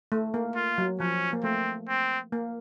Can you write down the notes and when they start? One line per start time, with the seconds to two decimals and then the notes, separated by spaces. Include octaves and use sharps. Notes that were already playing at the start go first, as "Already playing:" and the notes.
0.12 A3
0.34 A#3
0.56 F4
0.78 F#3
1.00 F3 C#4
1.33 A#3
1.44 A3 C4
1.88 C4
2.32 A#3